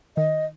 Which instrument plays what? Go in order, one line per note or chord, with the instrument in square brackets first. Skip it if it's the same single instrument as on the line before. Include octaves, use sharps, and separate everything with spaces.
[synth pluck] D#3 [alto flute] D#5